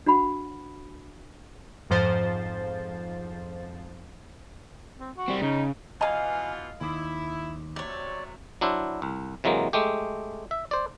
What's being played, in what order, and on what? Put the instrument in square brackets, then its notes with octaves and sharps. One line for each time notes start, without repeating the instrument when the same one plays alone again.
[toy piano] D4 F#4 F#5 B5
[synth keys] F2 G#2 F3 C5 A6
[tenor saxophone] C4
F#4
[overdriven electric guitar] G3 C4
[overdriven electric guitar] C#3 [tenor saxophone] D#4
[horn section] B2 E3 F4 [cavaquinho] D#5 F5 [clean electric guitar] G#5
[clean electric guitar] D#2 [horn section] E4
[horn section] C3 F#3 A3 [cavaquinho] C#5 D5
[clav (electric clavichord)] F#3 D4 E4 C5
C2
C3 E3 F#3 G#3 A#3
G#3 A3 G4
E5
C5 D5